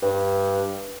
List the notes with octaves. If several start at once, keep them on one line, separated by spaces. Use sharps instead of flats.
G2